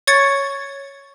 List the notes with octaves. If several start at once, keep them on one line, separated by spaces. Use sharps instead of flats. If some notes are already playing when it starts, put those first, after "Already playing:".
C#5 C#6 G#6 A6 C#7